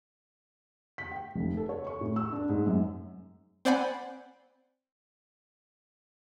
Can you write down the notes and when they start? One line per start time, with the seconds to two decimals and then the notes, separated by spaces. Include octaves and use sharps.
0.98 B6
1.12 G5
1.35 F1
1.57 A4
1.69 C#5
1.87 C#6
2.01 A2
2.16 E6
2.33 D4
2.49 G#2
2.66 F#2
3.65 C4 C5 D5 F#5 G#5 B5